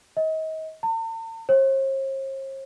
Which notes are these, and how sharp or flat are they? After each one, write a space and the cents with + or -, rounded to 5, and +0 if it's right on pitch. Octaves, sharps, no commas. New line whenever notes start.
D#5 +30
A5 +45
C5 +45